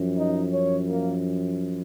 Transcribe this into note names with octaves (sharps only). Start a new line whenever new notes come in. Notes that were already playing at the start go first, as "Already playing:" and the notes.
Already playing: F#2 F3
D#4 D#5
C#4 C#5
A#3 A#4